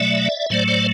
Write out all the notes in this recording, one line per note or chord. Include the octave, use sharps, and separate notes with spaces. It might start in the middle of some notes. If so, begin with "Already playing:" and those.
Already playing: B2 F#3 A3 D5 E5
A2 F#3 A3 C5 D5
C5 D5